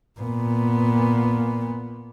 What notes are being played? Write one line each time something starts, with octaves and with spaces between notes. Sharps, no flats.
A#2 B3